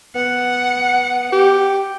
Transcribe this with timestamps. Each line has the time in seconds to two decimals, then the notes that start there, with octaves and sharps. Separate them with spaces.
0.15 B3 F#5
1.32 G4